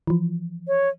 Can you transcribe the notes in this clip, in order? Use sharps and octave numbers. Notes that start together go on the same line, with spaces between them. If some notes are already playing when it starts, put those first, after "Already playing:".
E3 F3
C#5